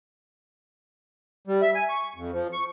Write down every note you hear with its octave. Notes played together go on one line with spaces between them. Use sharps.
G3
E5
G#5
C#6
F2
F3
C#6